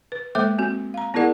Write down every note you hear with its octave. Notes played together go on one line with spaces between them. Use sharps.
B4
G#3 A#3 A4 C5 E5 D6
C4 F#4
F5 A#5
B3 E4 G#4 A#4 D5 F#5